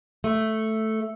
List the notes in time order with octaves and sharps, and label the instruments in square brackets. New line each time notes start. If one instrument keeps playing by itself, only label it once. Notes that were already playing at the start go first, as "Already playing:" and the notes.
[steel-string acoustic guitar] A3